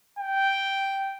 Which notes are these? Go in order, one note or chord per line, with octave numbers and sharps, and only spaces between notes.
G5